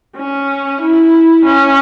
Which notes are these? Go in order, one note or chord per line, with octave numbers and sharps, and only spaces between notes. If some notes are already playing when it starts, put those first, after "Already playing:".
C#4
E4
C#4